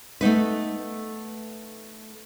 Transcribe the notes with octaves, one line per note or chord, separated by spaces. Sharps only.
A3 B3 D#4 B4